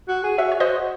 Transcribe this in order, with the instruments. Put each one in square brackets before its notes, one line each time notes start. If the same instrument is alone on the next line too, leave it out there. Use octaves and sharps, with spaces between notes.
[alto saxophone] F#4
G#4
[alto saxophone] F#4 [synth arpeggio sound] C#5 E5
[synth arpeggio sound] C#5
[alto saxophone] F#4 [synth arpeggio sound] C5 D#5